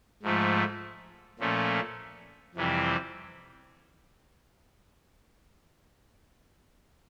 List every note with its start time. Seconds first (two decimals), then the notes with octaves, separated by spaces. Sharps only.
0.22 G#2 F3 A3
1.39 A#2 F3 A3 C#4
2.55 F2 C3 E3 G3 C4